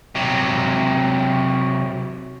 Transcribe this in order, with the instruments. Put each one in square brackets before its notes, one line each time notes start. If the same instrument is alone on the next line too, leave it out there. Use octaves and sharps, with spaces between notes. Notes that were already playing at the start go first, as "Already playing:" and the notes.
[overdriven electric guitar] C3 F#3